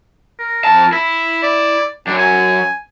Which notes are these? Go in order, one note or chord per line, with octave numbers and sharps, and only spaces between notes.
A#4
F2 A5
E4 B5
D5
F#2 F#3 D4
G#5